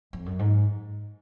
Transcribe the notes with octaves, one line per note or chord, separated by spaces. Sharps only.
F2
F#2
G#2